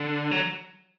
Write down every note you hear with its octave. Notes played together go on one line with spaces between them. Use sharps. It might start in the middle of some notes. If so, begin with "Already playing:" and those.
Already playing: D3
F#3